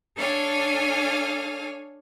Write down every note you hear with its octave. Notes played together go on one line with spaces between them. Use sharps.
D4 A4 C#5 F5 G#5